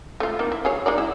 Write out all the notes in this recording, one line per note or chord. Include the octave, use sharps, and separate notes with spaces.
A3 F4
A#3 C4 D#4
E4
F#3 G#4 C#5
G#3 D#4 D5
E4